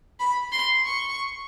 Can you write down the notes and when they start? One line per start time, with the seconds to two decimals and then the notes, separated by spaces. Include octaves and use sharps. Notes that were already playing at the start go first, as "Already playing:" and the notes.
0.20 B5
0.52 C6
0.85 C#6